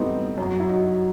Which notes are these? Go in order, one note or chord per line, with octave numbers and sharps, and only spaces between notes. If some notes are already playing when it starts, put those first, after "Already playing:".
Already playing: A2 E3 G3 A3 B3 C4 D#4
F#2 F#3
E4
D#4 F#4